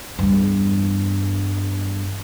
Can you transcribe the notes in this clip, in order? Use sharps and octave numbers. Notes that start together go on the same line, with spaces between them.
E2 G2